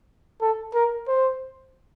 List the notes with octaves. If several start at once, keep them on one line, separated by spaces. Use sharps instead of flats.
A4
A#4
C5